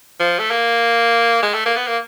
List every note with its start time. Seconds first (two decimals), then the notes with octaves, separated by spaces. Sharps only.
0.20 F3
0.39 A3
0.51 A#3
1.43 G#3
1.54 A3
1.66 A#3
1.77 B3
1.87 A#3